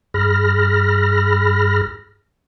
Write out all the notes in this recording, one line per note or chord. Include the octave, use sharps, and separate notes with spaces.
G2 G#4 B5 F6 A#6